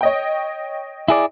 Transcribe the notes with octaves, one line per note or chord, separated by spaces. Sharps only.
C#5 D#5 G5
E4 G#4 D5